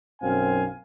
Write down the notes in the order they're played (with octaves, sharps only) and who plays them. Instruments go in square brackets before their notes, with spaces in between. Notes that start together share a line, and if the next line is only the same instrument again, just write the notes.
[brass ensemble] B1 F#2 C4 F5 G#5